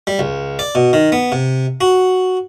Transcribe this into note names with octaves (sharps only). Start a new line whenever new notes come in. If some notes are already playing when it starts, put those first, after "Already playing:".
G3
C#2
D5
B2
D#3
B3
C3
F#4